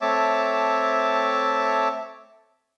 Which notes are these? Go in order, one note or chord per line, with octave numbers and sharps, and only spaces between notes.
A3 C4 C#5 E5 A5 D6